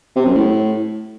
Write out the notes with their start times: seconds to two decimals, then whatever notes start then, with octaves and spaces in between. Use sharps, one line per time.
0.16 C3
0.25 F#2
0.35 A2